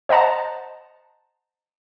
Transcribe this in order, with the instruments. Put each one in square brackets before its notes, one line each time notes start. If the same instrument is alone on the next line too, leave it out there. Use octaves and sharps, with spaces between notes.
[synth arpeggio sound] C5 D#5 F#5 A5 A#5